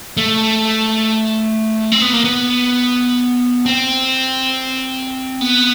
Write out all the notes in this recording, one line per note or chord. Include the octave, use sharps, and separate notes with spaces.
A3
C4
B3
A#3
B3
C4
B3